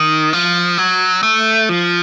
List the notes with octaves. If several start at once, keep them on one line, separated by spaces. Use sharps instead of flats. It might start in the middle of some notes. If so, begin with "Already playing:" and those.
Already playing: D#3
F3
F#3
A3
F3